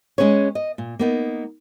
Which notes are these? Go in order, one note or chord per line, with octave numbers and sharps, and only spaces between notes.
G#3 A3 C#4 G#4 B4 C#5
D#5
A#2
A#3 B3 D#4